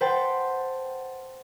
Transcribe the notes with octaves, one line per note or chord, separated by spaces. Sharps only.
B4 C5 F#5 G5 A5 A6